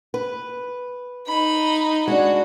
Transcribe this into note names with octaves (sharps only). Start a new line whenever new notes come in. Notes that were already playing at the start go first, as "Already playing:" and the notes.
B4
D#4 B5
G#3 D4 F#4